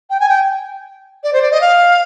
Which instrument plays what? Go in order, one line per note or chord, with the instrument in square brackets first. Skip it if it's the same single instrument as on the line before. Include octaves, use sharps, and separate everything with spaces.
[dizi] G5
G#5
G5
D5
C5
D5
D#5
F5